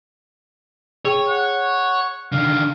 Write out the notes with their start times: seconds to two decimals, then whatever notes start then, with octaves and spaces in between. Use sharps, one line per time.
1.05 G#4 C#5 G5
1.29 F#5
2.32 D3 D#3 F5